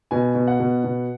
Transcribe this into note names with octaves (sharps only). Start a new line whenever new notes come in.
B2 G#5
B2
F#5
B2
B2